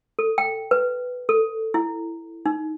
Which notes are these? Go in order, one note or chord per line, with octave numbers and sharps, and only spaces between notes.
A4
G5
B4
A4
E4
D#4